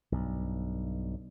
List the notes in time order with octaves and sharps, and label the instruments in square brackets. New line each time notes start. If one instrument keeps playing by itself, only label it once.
[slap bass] B1 G2